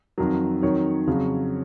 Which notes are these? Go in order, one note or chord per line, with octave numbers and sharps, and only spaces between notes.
F2 D#3 F#3
F2 D#3 F#3 C#5
F2 C#3 F#3